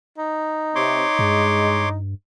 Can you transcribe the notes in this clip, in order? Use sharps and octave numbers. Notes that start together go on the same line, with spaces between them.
D#4
C3 C#5 C6 D6
G2 G#3